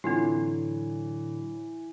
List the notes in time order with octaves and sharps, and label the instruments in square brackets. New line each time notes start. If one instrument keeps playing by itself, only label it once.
[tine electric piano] A2 D3 F#3 [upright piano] E3 [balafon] C4 E4 F4